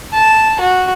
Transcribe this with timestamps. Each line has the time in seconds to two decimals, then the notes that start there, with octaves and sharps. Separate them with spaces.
0.14 A5
0.60 F#4